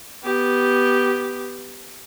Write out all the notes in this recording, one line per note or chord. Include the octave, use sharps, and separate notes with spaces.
B3 G4